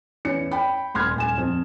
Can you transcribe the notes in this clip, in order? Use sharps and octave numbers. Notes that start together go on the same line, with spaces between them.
E2 C#4 C#7
G5 B5
D#1 C6 F6 G#6
D#1 G#5 E7
F2